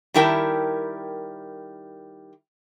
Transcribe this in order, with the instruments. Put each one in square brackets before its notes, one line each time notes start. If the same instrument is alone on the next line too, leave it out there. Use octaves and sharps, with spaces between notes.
[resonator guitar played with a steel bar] D#3 G3 E4 A#4 G5 A5